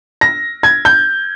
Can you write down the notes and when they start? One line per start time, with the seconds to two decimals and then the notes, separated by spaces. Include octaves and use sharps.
0.21 A#6
0.63 G#6
0.85 G6